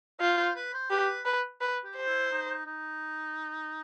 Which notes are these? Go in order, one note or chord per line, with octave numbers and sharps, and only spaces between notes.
F4 C5
C5
B4
C5
G4 B4
B4
B4
G4
C5
E4
D#4
D#4